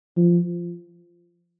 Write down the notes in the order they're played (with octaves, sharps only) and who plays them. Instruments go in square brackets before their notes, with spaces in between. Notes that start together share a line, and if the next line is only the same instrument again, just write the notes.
[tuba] F3